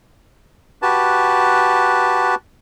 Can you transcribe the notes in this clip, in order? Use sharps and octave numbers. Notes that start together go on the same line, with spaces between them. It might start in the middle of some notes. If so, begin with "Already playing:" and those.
F#4 G4 B4 A5